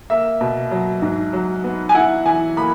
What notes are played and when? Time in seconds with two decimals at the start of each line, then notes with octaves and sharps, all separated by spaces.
0.10 A#3 E5
0.41 B2
0.71 F#3
1.02 G#2
1.33 F#3
1.64 B3
1.89 G#5
1.95 E4 F#5
2.25 E3 G#5
2.56 A#3 B5